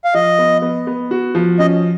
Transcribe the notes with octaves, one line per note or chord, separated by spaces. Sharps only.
F5
F3 D#5
B3
B3
B3
F#4
F3
C#4 D#5